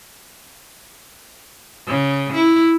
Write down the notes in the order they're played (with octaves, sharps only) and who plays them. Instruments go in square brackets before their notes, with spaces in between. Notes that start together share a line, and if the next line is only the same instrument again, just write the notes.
[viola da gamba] C#3
E4